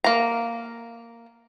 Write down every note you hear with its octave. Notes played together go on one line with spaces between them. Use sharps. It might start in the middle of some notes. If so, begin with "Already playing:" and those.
A#3 A#5